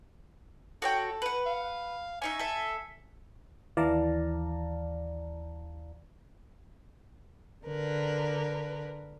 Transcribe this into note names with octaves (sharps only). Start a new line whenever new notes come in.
F#4 A4 C#5 G5
B4 F#5
F5
C#4 D#4 E5 G#5
A4 E5
D#2 E3 D5 F5 A5 A#5
D3 A#4 B4